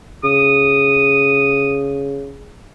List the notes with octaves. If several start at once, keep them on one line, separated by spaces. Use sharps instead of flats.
C#3 D#6